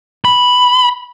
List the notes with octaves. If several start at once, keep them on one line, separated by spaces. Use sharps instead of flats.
B5